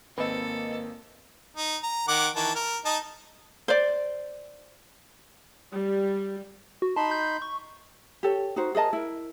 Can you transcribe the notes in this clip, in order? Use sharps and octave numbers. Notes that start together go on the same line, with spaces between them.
G#1 A#3 C4 A4 B4 D#5
D#4
A#5
D#3 F#5 D6
D#3 E3 A5
A#4
D#4 D#5 A5
C5 D5
G3
F#4
D#4 A5 B5 C6
G6
C#6
G4 A4 C#5
D#4 F#4 C5
G#4 A#4 D#5 A5
E4 A#4